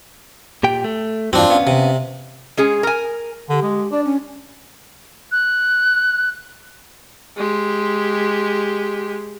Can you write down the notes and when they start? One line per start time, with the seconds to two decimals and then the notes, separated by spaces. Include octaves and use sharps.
0.63 A#2 G4 G5
0.84 A3
1.33 E2 G2 C4 D4 F4 F#4
1.50 B3 C#4 F5
1.67 C3
2.57 G#3 C#4 G#4
2.83 A#4 G#5
3.50 D3 G4
3.62 G#3
3.92 D4 D5
4.05 C#4
5.32 F#6
7.37 G#3 G4